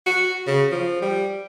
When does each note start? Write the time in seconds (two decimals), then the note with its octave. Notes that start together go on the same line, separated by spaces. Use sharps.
0.06 F#4
0.47 C#3
0.71 F3
1.02 G3